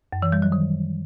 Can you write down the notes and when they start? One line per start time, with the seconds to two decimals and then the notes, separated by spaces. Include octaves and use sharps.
0.13 F#2
0.22 E3
0.32 G3
0.42 F#3
0.52 D#3